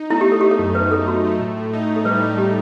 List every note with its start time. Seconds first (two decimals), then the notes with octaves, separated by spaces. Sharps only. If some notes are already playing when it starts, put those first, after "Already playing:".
Already playing: D#4
0.10 A3 E4
0.21 G4
0.27 A3
0.32 A4
0.41 A3 G4
0.51 A4
0.59 F#2
0.75 F#2 B4
0.91 F#2 A4
1.08 F#2 F#4
1.25 A3
1.40 A2
1.57 A2
1.73 D#4
1.89 A2
1.96 A4
2.05 G3 B4
2.22 D#4
2.38 A2 G4